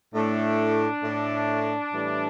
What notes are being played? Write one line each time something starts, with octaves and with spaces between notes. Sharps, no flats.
A2 A3 D4
A2 A3
A2 E3 G3